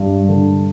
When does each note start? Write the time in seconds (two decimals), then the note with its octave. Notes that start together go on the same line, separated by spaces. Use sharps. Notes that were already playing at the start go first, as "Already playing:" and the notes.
Already playing: G2
0.29 D3